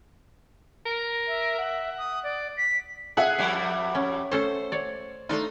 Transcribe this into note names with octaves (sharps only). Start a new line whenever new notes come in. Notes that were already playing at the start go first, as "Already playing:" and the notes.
A#4
E5
F#5
D#6
D5
B6
G#4 E5 F#5 F#6
F2 G3 G#5
C#4
A3 C#4 A4 C5
C#5 D5
A3 D4 D#4 F4